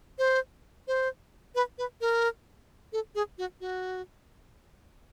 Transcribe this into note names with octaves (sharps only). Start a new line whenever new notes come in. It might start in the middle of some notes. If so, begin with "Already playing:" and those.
C5
C5
B4
B4
A#4
A4
G#4
F#4
F#4